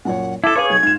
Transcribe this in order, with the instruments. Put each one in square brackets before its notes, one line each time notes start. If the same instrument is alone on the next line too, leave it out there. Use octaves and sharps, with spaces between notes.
[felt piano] F#2 A#2 C#5 [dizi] F#5
[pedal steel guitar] E4 A4 [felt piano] A5 A6 [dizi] D6
[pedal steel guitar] G#4 C#5 [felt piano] B4 F5
[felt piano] B1 [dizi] G#6
[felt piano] G#2 E7 [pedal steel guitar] F4